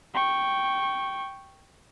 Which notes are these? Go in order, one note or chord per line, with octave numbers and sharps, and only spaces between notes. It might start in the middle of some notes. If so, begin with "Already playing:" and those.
G5 C#6